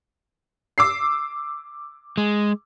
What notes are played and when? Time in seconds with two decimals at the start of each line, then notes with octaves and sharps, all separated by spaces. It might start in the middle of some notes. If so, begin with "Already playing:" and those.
0.78 D6 E6 C7
2.18 G#3